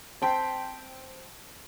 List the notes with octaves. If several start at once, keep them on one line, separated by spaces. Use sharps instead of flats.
C4 G5 A5 C6 B6